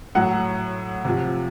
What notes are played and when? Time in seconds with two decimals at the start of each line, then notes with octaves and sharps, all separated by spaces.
0.15 A2 F#3 F#5
1.05 C3 F3